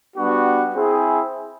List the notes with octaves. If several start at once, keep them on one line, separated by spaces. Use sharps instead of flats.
G3 B3 D4 F#4
C4 E4 G#4